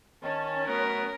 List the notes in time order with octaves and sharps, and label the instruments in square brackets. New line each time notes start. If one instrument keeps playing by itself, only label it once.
[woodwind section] D#3 A5 [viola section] C#4
[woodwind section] F#3 A3 B3 [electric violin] A#4